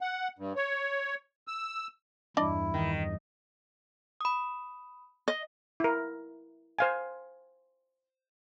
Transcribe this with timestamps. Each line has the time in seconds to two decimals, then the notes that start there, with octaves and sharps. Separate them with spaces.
0.01 F#5
0.38 G2
0.56 C#5
1.48 E6
2.37 E2 G2 D4 E4 D5 D#5
2.74 D#3
4.21 B5 D#6
5.28 D#5
5.80 E4 A#4
6.79 C5 F5 G#5